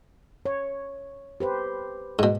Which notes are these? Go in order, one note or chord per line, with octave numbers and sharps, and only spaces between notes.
C#5
G4 B4 C5
G#2 B2